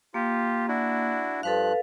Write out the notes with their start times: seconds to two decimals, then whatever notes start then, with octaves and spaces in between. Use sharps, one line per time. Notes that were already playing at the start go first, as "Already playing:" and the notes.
0.14 A#3 F4 G4
0.68 D4 E4 F#4
1.43 G2 F3 A4 B4 F5 F#6